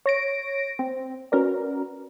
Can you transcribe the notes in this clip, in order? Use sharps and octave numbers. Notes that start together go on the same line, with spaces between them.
C#5 A#6 D7
C4
C#4 F#4 A#4 B4 D5